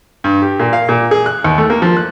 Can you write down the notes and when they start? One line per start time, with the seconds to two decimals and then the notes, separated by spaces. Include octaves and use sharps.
0.24 G2
0.42 G4
0.59 A#2
0.73 F5
0.89 A#2
1.11 G#4
1.26 F#6
1.44 D#2
1.58 A3
1.70 A#3
1.82 F3
1.97 F#6